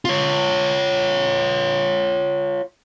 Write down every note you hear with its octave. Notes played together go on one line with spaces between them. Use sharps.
F4 C#5